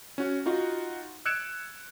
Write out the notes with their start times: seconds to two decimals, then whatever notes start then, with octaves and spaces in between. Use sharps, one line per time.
0.18 C#4 F#4
0.46 D#4 F4 F#4 F#5
1.25 E6 F#6 G#6 C#7 D7 E7